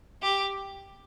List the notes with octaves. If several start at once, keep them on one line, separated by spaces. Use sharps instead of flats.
G4